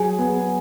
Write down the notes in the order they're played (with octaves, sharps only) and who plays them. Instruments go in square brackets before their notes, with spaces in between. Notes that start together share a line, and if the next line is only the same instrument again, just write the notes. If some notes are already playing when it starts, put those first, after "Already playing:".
Already playing: [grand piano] F#3 [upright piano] G#4
[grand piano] B3